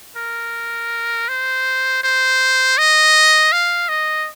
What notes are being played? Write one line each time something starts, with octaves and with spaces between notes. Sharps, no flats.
A#4
C5
C5
D#5
F5
D#5